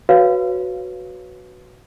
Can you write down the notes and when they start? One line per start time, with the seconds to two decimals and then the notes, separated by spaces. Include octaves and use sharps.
0.09 F#4 B4 C#5 F5